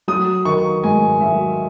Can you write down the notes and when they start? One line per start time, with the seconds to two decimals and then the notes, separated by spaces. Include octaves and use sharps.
0.08 F#3 D#6
0.45 D#3 C#6
0.83 G#2 G#5
1.21 F#3 E5